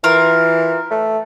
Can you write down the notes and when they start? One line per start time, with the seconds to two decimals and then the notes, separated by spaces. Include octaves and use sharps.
0.04 E3 F4 A#4
0.91 A3